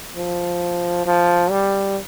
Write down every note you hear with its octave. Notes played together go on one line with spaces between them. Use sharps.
F3
F3
G3